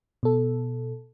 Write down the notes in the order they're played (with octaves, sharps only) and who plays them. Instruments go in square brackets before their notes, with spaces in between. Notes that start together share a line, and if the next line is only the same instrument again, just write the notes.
[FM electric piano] B2 A4